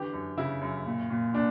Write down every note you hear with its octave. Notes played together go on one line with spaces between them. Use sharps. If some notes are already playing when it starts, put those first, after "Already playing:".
Already playing: D3 E3 G4
F#2
C#3 E4
F#2
A#2
A#2
A#2 D4